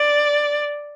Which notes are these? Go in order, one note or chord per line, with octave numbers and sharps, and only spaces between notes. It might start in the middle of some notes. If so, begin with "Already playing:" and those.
Already playing: D5